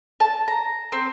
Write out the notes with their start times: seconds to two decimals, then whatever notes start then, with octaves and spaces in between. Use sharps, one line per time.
0.20 A5
0.48 A#5
0.92 C4